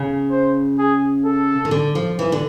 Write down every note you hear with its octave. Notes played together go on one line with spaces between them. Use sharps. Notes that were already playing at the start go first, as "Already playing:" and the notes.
Already playing: C#3
C5
G#4
A4
D#3
D3
F3
E3
D3